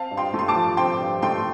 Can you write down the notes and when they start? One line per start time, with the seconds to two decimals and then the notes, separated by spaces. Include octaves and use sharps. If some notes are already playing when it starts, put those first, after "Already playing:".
Already playing: C4 F5 A5
0.11 G2
0.17 G5 C6
0.34 A3
0.39 C6
0.48 A5 D6
0.56 F3
0.77 C4 G5 C6
1.00 G2
1.22 A3 G5 C6